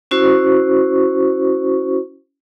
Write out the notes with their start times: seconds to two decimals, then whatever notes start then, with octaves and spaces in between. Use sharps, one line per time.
0.11 C#4 E4 F#4 C5 C#6